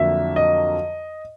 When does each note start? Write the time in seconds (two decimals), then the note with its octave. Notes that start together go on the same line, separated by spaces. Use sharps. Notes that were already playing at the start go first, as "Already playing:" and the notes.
Already playing: F2 D3 F#3 A#3 E5
0.36 D#5